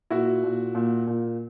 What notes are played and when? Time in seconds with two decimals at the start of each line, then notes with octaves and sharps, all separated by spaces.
0.10 A#2 E4 F#4
0.44 A#2
0.75 A#2
1.07 A#2